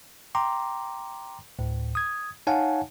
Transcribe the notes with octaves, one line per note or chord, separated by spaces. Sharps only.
G5 A#5 C6 D6
D2 A2
D#6 G#6
D#4 C#5 F5 F#5 G#5 A5